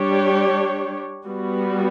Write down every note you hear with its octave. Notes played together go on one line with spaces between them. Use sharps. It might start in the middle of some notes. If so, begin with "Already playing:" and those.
Already playing: G3 D4 G4 C#5
G3 B3 F#4